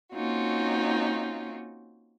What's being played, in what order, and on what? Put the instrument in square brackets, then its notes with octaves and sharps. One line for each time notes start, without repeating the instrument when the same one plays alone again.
[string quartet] A#3 C4 C#4 D#4 F4 F#4